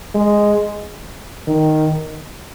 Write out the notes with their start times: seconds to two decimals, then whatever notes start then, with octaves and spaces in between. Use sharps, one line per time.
0.15 G#3
1.47 D#3